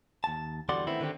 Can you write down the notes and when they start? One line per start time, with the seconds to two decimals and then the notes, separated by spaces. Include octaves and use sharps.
0.24 D#2 A5
0.69 E2 D3 G3 F#4 D5 C6
0.87 D#3 A3 B3 C4 E4
1.01 D3 D#3 C4 F#4 G4